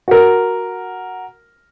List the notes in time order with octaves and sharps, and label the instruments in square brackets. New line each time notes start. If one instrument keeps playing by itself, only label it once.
[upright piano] F#4 A#4